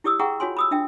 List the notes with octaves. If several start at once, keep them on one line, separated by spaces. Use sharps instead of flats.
E4 G4 D5 D#6 E6
G#4 E5 F#5 G5 A#5 C#6
F4 F#4 C#5 G#5 C6
B5 D#6 E6
D4 E5 G5